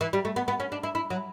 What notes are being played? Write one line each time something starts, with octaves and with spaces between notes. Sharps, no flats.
E3
G3
A3
B3
B3
C#4
D4
E4
E4
F#3